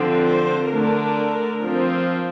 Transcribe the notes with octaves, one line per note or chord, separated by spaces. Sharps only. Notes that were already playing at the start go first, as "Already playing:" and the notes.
Already playing: D3 F3 C4
C5
D3 A3 D4 A#4
F3 C4